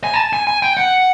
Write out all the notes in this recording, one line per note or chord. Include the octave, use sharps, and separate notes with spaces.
G#5
A5
G#5
G#5
G5
F#5